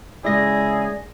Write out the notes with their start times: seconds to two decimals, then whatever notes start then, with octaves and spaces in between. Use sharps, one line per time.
0.24 C#3 G#3 D#4 E4 G#4 D5 A#6